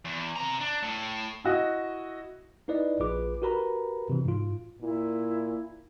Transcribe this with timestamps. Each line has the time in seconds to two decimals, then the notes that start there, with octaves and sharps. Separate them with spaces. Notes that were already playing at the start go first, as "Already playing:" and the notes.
0.05 E2
0.36 C3 A#5
0.60 D4
0.83 A2
1.44 E4 F#4 D#5
2.68 D#4 E4 B4 D5 D#5
3.00 A#1 F4 G#4 B4 D6
3.42 F#4 G4 A#4 B4 A#5 B5
4.10 C3 E3
4.25 G#2 F4
4.81 A#2 E4